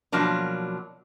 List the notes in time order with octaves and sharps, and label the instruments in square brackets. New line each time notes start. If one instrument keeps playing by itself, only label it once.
[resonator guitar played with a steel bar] B2 F3 F#3 A#3 D4